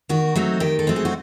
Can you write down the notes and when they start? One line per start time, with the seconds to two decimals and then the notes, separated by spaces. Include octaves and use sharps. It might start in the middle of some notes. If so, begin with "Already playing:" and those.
0.09 D#3 F#4
0.35 F#3 A3 C4 D#4
0.60 D#3 G4
0.79 A4
0.87 F#3 A3 C4 D#4
0.96 G#4
1.05 F#4